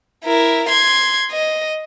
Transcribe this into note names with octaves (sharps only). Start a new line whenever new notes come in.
E4 A#4
C6 G#6
D#5